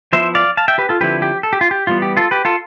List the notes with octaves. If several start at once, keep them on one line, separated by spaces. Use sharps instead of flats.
F3 B3 E4 C5 E5
D5 F5
F5 A5
E5 G5
G4 B4
F4 A4
D3 F3 C4 E4 G4 B4
G4
A4
G4
F4
G4
E3 G3 B3 F4
G4
F4 A4
G4 B4
F4 A4